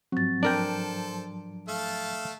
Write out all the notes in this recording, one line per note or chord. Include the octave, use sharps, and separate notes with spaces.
G#2 F3 F#3 C4 A6
D4 A4 A#4 C5 G5 D7
A3 F5 A5